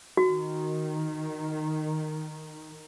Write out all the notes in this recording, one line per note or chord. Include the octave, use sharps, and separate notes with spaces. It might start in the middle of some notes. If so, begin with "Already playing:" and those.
D#3 F#4